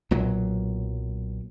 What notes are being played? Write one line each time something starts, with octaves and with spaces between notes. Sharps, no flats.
B1 A#2 F#3